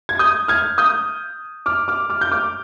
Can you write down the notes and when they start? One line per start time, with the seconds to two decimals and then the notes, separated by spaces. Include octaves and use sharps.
0.09 G#6
0.19 D#6 G6
0.48 F6 G#6
0.78 D#6 G6
1.66 D6 F6
1.88 D6 F6
2.10 D6 F6
2.21 G6
2.32 D6 F6